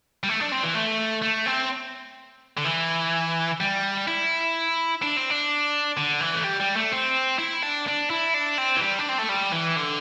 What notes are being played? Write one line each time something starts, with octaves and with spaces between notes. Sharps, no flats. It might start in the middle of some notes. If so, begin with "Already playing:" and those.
G3
A3
D4
C4
E3
A3
A3
C4
D3
E3
G3
E4
D4
C4
D4
D3
E3
A3
G3
G3
A3
C4
E4
D4
D4
E4
D4
C4
E3
G3
D4
C4
A3
G3
E3
D3